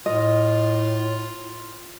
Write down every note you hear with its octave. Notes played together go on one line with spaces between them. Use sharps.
A2 F4 D#5